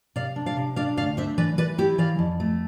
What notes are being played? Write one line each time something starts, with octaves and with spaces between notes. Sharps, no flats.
C3 D5 F5
D4
D5 F5
C3
D4 D5 F5
D2 D5 F5
D4 C5 E5
E3 B4 D5
E3 B4 D5
E4 G4
E3 D5 F5
F2
A3